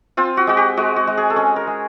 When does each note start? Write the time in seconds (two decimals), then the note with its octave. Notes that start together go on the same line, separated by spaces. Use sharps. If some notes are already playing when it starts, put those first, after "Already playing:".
0.17 C4 F4
0.37 F#4
0.47 G#3 F#4
0.57 G4
0.77 G#3 F#4
0.96 F#4
1.07 G#3
1.17 G#4
1.30 A4
1.36 C#4 G#4
1.56 A#4
1.67 G#3